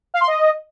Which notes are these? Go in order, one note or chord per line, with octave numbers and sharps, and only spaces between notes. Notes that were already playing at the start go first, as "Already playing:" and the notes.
F5
C6
D#5